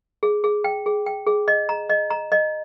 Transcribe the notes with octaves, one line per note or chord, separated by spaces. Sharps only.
G#4
G#4
G5
G#4
G5
G#4
D#5
A#5
D#5
A#5
D#5